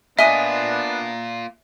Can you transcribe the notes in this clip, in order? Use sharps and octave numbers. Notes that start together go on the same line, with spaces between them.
A#3 B3 D4 F4 D#5 E5 G#5 D#6